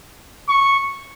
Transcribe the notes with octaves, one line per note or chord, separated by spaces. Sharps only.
C#6